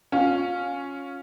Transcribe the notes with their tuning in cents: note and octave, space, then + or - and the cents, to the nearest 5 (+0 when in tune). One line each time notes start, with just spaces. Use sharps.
C#4 +0 F4 +25